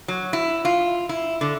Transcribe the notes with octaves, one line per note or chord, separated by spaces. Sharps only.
F#3
E4
F4
E4
D3